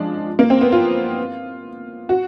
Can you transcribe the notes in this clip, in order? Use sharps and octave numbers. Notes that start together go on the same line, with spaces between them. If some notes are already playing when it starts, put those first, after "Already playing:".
Already playing: F3 G#3 D4
A#3
C4
B3
F4
F#4